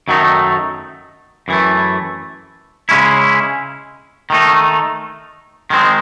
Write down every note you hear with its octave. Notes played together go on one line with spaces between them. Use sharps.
F#2 D#3 F#3 A3 D#4
F#2 E3 A3
C#3 G#3 C#4 E4
D#3 A3 D#4
D#3 G#3 C4